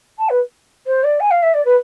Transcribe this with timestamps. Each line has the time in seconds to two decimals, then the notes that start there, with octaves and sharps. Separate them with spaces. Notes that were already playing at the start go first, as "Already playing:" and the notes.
0.18 A5
0.29 B4
0.86 C5
1.03 D5
1.20 G#5
1.30 F5
1.42 E5
1.53 D5
1.65 B4